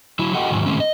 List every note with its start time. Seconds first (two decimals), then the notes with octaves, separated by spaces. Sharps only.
0.19 F#3 E4
0.34 F#4 G4 A4 D#5 F#5 G5
0.50 E2 G#2 D#3 F#3
0.66 A2 D#3 G#3 C4 C#4
0.80 D#5